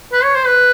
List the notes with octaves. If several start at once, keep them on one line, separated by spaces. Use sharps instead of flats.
B4
C#5
C5
B4